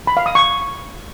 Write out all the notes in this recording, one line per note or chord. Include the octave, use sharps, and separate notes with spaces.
B5
F5
D#6
C#6